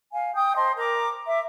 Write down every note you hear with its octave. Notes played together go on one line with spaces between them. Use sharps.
F5 G#5
G5 D#6 G6
C5 D#5 A5 C6
A#4 A#5 D6
E5 D6